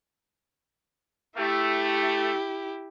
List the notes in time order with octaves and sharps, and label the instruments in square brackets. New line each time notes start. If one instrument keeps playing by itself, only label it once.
[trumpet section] A3 [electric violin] E4 G4